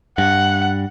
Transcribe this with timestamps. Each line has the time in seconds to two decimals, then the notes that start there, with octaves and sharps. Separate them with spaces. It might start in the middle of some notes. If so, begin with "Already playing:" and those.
0.18 G2 F#5